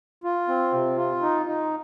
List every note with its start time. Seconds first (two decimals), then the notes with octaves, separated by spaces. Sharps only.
0.24 F4
0.48 C4
0.73 C3
0.97 F4
1.22 D#4
1.46 D#4